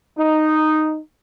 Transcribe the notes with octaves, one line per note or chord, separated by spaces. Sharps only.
D#4